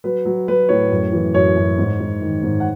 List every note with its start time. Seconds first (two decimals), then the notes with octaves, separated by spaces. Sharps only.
0.04 F#3 B4
0.25 F#3
0.48 F#3 B4
0.69 A2 C#5
0.92 F#2
1.13 E3
1.34 F#2 C#5
1.56 F#2
1.78 G#2
2.00 G#2
2.22 D#3
2.43 G#2
2.60 F#5